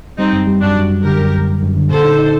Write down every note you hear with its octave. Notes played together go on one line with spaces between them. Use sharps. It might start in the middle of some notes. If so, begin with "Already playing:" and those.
G3 C4 D#4
F#2
G3
F#2 D4 F#4
F#2
F#2
D3 G4 A#4
F#2
F#2
F#2
F#2
D3
A#2 A4 C5
D#4
D#4